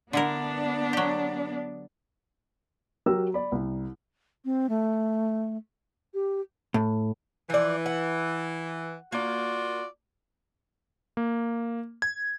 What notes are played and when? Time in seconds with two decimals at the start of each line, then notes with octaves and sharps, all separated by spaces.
0.13 D3 B3 D4 E4 A#4
0.93 F#3 G4
3.06 F#3 G4 A#4 E6
3.34 D5 B5
3.52 C2
4.45 C4
4.69 A3
6.14 G4
6.74 A2
7.50 E3 F3 D5
7.86 F#5
9.12 A#3 F4 F#4 D5
11.17 A#3
12.02 G#6